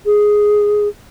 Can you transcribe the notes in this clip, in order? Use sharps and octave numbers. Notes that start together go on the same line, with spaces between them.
G#4